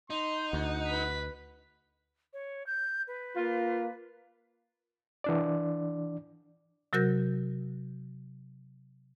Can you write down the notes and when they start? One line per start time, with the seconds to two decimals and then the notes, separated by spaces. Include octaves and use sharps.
0.10 D#4 C6
0.53 D2 F#5
0.87 B4 B6
2.33 C#5
2.67 G6
3.08 B4
3.36 A#3 F4
5.24 E3 D4 D5
6.93 C3 F#3 F#4 A#4 G6 A#6